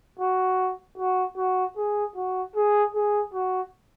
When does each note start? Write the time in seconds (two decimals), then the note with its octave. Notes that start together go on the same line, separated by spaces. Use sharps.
0.19 F#4
0.98 F#4
1.38 F#4
1.77 G#4
2.16 F#4
2.56 G#4
2.95 G#4
3.34 F#4